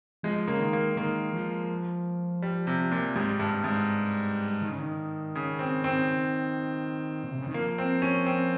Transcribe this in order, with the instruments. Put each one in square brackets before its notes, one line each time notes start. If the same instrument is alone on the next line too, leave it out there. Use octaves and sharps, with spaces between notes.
[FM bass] F3 [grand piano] G#3
[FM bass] C#3 [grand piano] A#3
[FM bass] D#3
[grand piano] A#3
[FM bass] D#3 [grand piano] A#3
[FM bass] F3
[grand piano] G3
C3
A#2
[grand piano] G#2 [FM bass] G3
[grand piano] G2
G#2
[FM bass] D#3
C#3
D#3
[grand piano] C#3
C4
C4
[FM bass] A#2
C3
C#3
D#3
[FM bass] F3 [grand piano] A#3
[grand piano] C4
C#4
C4